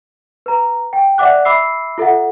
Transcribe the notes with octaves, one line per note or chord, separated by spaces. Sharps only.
B4 A#5
G5
D5 E5 F#5 D6 F#6
E5 B5 D6 E6 C7
F4 A4 E5 F#5